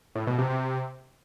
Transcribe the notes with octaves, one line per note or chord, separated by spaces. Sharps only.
A2
B2
C3
C3